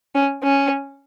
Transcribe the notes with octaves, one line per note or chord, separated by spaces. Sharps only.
C#4
C#4